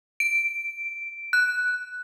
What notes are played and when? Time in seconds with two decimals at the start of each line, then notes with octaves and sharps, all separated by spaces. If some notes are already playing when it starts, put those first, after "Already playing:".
0.20 D7
1.33 F#6